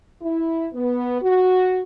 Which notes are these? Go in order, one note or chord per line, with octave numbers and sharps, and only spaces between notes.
E4
B3
F#4